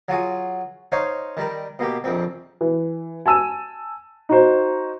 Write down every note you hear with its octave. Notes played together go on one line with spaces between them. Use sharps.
F#3 F4 F#4 G#4
D#4 C5 C#5 F5
D#3 G3 A#4
B2 A#3 G4
A#1 F2 C4
E3
G#5 A5 E6 D#7
D#4 F#4 C5